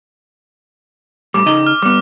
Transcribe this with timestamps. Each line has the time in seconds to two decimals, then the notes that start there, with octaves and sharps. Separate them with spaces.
1.34 A2 G3 D6
1.46 C#3 D#4 D#5
1.66 F6
1.82 G3 B3 D6